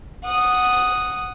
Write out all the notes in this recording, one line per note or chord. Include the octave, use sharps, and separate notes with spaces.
F#5 D#6